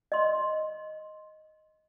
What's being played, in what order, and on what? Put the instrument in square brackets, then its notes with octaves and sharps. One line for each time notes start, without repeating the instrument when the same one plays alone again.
[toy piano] D#5 C6